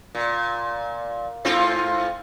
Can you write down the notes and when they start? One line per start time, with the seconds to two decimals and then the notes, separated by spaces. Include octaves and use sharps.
0.15 A#2
1.45 G#2 C4 F4